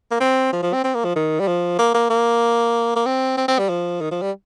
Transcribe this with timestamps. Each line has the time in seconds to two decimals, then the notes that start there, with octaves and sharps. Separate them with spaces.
0.11 A#3
0.20 C4
0.53 F3
0.63 F3
0.73 C4
0.84 C4
0.95 A#3
1.05 F3
1.16 D#3
1.40 G3
1.47 F3
1.79 A#3
1.95 A#3
2.10 A#3
2.96 A#3
3.06 C4
3.37 C4
3.48 C4
3.59 G3
3.69 F3
4.01 D#3
4.11 F3
4.22 G3